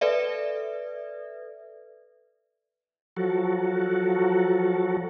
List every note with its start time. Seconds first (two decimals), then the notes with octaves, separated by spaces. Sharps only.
0.01 A4 B4 D5 E5
3.17 F3 F#3 F#4 A4